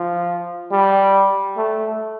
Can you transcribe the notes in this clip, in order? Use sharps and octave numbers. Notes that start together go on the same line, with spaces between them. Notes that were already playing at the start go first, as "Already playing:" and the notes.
Already playing: F3
G3
A3